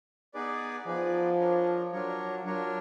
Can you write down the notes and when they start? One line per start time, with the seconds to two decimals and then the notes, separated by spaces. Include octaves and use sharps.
0.34 B3 D#4 G#4 B4 D5
0.87 F3 B3 D#4 G#4 B4 D5
1.40 D4 F4 A#4 C#5
1.92 F#3 D4 F4 A#4 C#5
2.45 F#3 D4 F4 A#4 C#5